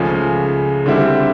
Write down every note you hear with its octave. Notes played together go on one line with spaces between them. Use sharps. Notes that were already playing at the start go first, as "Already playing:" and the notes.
Already playing: C#2 C#3 F3 A3 C#4
D3 G3 C4 E4